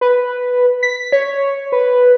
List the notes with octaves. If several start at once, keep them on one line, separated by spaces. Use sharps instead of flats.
B4
B6
C#5
B4